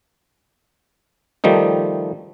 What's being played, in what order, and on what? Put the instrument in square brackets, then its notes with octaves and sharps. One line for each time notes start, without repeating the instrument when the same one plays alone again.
[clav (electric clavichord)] D#3 F3 G3 A3 D#4